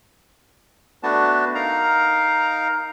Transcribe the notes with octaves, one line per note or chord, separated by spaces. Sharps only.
A3 B3 D4 F#4 A5
D#4 A#4 F5 A#5